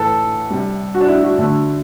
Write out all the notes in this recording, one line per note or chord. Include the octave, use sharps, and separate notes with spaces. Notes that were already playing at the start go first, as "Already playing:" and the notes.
Already playing: A2 E3 A4 B4
C3 G3
F#4
D4
E4
F#4
D3 A3